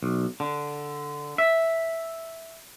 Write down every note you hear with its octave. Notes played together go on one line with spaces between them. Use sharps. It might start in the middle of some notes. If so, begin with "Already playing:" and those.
B1
D3
E5